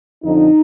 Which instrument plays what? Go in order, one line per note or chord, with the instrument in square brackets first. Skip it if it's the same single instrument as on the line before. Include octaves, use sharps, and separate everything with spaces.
[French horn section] F2 D3 F3 D#4